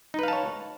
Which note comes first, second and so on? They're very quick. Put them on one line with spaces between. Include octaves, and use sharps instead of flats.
D#4 B4 F5 A5 C#5